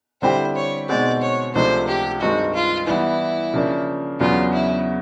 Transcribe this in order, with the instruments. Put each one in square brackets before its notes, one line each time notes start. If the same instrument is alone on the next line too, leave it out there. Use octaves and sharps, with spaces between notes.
[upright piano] D3 G3 C4 E4 G4 [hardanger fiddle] C5
[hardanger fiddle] C#5
[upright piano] B2 G#3 C4 D#4 [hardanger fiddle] D5
[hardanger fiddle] C#5
[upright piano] C#2 C3 F3 A3 D4 [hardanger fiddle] C5
[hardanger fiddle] G4
[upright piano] G2 D#3 G#3 C4 D#4 [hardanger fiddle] F#4
[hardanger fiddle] F4
[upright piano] E3 G3 B3 [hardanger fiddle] E4
[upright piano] C#3 F3 A#3 D4
[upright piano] E2 C#3 F#3 B3 D4 [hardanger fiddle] F4
[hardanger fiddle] E4